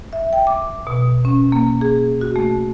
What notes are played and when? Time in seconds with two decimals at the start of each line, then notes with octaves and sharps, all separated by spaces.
0.13 E5
0.33 G5
0.47 D6
0.87 B2
1.25 C#4
1.52 A#3
1.81 G#4
2.21 F#4
2.36 A3